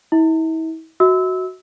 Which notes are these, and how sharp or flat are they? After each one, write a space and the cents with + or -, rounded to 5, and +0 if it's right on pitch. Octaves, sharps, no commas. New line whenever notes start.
E4 -40 E5 -40
F#4 +0 E5 -40 E6 -20